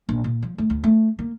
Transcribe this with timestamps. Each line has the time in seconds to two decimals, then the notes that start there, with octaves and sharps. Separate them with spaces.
0.09 A#1
0.24 A#2
0.42 F3
0.58 A3
0.70 D2
0.84 A3
1.19 A#3